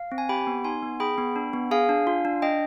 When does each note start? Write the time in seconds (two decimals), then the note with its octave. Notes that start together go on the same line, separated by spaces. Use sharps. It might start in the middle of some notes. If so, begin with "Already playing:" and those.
Already playing: F5
0.12 C4
0.18 G#5
0.29 G4 G5 B5
0.47 B3
0.65 D#4 G#5 C6
0.83 B3
1.00 G#4 G5 B5
1.18 B3
1.36 D4
1.53 B3
1.71 G#4 F5 G#5
1.89 D4
2.07 F4
2.25 D4
2.42 D4 D#5 G5